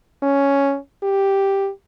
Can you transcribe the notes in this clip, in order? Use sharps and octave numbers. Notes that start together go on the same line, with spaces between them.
C#4
G4